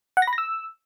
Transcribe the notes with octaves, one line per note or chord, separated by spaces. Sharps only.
F#5
A#6
B5
A#6
E6